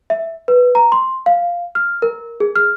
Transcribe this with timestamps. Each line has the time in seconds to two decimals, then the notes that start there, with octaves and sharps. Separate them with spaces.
0.10 E5
0.48 B4
0.75 A#5
0.92 C6
1.26 F5
1.75 F6
2.02 A#4
2.40 G#4
2.56 F6